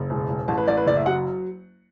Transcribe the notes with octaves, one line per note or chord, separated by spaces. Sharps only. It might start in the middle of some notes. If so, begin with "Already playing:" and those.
Already playing: F#1
E1
E1
A1 A5
B4
A1 D5
B4
F#1 D5
E5
F#3 F#5